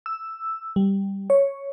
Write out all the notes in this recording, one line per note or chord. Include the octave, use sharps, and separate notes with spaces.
E6
G3
C#5